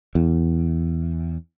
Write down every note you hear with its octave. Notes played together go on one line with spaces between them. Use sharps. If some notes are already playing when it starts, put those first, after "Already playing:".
E2